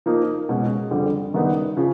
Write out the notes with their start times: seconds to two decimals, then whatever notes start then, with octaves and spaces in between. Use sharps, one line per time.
0.06 F3 A#3 D#4
0.49 B2 G#3 C#4
0.91 F2 D3 G3
1.34 F#2 D#3 G3 B3 D#4
1.77 C#3 F3